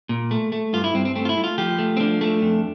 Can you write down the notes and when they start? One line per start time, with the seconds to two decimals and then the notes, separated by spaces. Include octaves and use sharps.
0.09 A#2
0.31 A3
0.52 A3
0.73 G2 F4
0.84 E4
0.94 G2 C4
1.05 C4
1.16 A3 C4
1.25 F4
1.29 E4
1.37 A3
1.44 F4
1.58 F3 G4
1.79 A3
1.97 C4
2.00 F3 D4
2.21 A3
2.42 F2